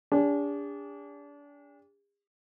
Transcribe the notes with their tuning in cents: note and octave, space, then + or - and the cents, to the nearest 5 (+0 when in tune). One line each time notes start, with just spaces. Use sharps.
D4 -30 G#4 -45